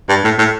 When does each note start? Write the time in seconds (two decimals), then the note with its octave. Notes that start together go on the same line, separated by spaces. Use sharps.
0.09 G2
0.24 A2
0.38 A2